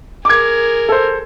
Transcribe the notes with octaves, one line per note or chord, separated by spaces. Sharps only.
G#4 A#4 D6 G#6
A4 C5